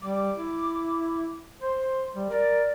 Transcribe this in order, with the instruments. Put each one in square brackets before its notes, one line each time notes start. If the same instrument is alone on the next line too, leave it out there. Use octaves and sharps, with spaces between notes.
[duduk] G3 [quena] D6
[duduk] E4
[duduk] C5 [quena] C6
[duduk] G3
[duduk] A#4 [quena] D5